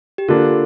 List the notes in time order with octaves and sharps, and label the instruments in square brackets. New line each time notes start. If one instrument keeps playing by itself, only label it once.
[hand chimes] G4
[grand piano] D3 A#3 D4 [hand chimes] F4